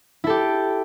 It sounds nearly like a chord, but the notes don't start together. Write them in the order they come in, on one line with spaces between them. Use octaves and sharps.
E4 A4 G4